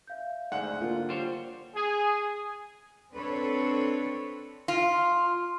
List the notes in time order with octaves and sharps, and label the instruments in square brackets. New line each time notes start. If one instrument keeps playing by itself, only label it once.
[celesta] E5 F5 G6
[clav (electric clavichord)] D2 G#2 [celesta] D5 [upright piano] F#5
[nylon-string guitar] D3 A#3 F4
[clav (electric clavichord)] G3 C5 C#5
[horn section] G#4
[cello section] C4 D4 A4 B4 C#5
[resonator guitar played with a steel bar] F4